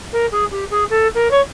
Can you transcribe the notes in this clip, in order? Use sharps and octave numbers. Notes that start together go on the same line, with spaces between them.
A#4
G#4
G4
G#4
A4
A#4
C#5